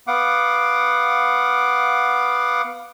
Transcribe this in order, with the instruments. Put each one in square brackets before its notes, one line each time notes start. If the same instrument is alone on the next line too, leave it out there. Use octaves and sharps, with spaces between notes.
[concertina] B3 F5 F#5 D6